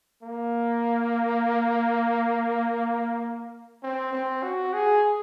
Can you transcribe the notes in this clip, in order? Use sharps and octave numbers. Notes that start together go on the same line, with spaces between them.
A#3
C4
C4
F#4
G#4